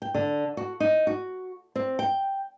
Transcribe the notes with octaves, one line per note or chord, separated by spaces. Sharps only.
G5
D3
F#4
D#4
F#4
C4
G5